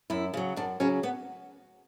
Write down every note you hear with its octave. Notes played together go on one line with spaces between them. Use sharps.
F#2 E4
C#3 F#3
F#2 D4
C#3 F#3 C#4
B3